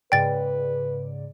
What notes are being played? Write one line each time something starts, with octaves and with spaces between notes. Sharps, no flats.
G#2 C#3 B4 D5 G5 A6